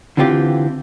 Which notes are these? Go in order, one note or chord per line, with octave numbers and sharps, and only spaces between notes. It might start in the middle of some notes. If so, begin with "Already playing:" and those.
D3 E3 C4 F4 G4